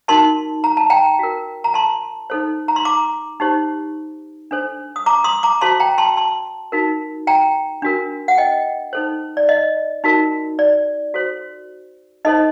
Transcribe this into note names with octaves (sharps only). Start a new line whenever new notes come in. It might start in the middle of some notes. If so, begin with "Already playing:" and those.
D#4 F#4 A#4 A5 C6
A#5
A5
G5 A#5
F#4 A#4
A#5
A5 C6
D#4 A4 C5
A#5
C6
A#5 D6
D#4 G4 C5
D4 A4 C5
D#6
A#5 D6
C6 D#6
A#5 D6
F#4 A4 C5 A5 C6
G5 A#5
A5 C6
A5 C6
D#4 F#4 A#4
G5 A#5
D4 F#4 A#4
F#5
D#5 G5
D#4 A4 C5
D5
D#5
D#4 F#4 A#4
D5
F#4 A4 C5
D#4 A4 C5 D#5